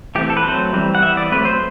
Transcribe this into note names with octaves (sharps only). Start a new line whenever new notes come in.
E3 A3 C4 G4
A4
B4
F#3 A3 C4 C5
E3 G3 C4
F#5
E3 B3 E5
D5
F#3 A3 C4 B4
C5